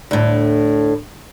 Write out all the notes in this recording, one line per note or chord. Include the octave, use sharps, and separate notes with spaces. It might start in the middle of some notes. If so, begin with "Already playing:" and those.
D2 A2